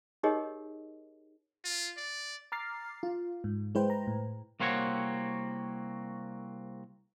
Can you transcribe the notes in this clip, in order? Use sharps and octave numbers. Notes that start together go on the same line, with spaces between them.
D#4 G4 G#4 A#4 C#5 D#5
F4
D5
A#5 D6 F6 A6 C7
F4
G#2
G#3 E4 B4 C5 G5
A#5
A2
C2 A#3 C4 F#4 C#5